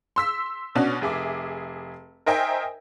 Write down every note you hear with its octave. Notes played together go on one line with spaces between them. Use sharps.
C6 E6 B6
B2 C#4 D4 F#4
F1 G#4 E5 D6
A#4 C5 D#5 E5 G5 G#5